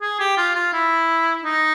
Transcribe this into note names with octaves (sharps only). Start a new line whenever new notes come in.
G#4
G4
F4
F4
E4
D#4